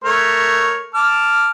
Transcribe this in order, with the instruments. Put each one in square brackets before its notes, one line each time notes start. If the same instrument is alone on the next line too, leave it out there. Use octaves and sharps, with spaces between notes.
[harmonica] A3 A#4 C#5
A5 D6 F6